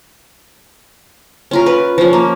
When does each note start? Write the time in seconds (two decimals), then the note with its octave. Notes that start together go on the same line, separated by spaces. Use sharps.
1.51 C#4 F4 A#4
1.66 B4
1.98 F3 C#4
2.13 A#3